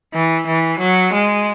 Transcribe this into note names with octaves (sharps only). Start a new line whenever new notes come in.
E3
E3
F#3
G#3